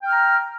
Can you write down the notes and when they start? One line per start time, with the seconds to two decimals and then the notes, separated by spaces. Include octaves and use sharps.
0.02 G5
0.07 F6
0.11 A#5